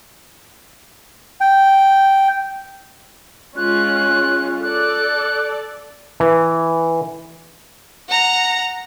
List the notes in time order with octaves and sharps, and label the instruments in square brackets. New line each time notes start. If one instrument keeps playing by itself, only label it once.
[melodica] G5
[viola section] G#3 C#4 F4 [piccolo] F#6
[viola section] A4 D5 [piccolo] F#6
[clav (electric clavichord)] E3
[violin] F#5 A#5